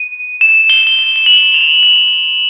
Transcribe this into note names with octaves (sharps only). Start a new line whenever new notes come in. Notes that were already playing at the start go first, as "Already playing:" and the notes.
Already playing: D#7
E7
G7
G7
G7
G7
F#7
F7
F7